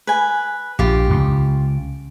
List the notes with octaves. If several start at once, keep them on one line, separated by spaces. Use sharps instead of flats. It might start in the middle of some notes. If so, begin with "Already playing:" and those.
B4 G#5
A#1 F4 G4
C#2